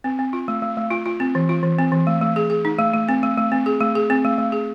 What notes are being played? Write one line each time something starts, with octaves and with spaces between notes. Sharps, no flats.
C4
C4
F4
A3
A3
A3
F4
F4
C4
E3
F4
E3
C4
E3
A3
A3
G#4
G#4
D#4
A3
A3
C4
A3
A3
C4
G#4
A3
G#4
C4
A3
A3
G#4